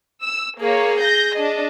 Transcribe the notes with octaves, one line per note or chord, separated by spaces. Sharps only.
E6
A#3 G#4 C#5
G6 A#6
D4 D#5